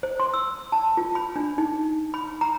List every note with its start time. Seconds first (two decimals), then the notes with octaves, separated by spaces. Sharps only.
0.03 C5
0.20 C6
0.34 E6
0.72 A5
0.97 F4
1.15 B5
1.36 D4
1.58 D#4
2.14 B5
2.41 A#5